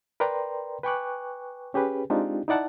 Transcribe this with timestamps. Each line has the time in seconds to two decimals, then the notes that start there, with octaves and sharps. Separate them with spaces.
0.20 A#4 B4 D5 G5 A#5 C6
0.83 B4 G5 G#5 C#6 D6 F#6
1.74 C#4 G4 G#4 B4
2.10 G#3 C4 D4 D#4 F4 G4
2.48 D#4 E4 D5 F#5 A5